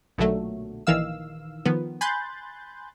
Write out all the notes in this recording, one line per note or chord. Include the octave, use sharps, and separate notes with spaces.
B1 A#2 D3 F#3 A3
A#1 D#3 E3 F5 E6
D#3 F3 B3
G#5 B5 C6 F#6 G6 A6